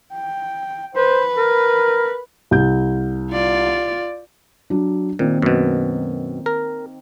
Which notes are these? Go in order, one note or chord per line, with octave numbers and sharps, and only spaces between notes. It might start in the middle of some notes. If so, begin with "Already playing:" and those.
G5
B4 C5
A#4
C2 G6
F4 D5
F#3 D4
A#2 D#3 A#3 C4
F#2 B2
A#4